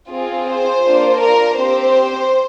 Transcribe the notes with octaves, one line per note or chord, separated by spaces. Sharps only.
C4 F4 G#4
C5
A#3 D4 F4
A#4
C4 G4 C5